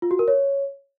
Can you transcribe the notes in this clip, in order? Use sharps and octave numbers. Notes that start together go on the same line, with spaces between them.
F4
F#4
A#4
C#5